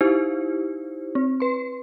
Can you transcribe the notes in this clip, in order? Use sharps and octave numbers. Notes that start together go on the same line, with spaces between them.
D#4 E4 G4 C5
C4
B4 C6